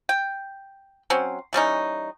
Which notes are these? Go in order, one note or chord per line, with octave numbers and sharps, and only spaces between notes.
G5
F#3 C4 C#4
E3 G3 C#4 D#4